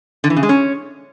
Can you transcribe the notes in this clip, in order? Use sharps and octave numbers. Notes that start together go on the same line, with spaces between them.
D3
E3
C#3
G#3
C#4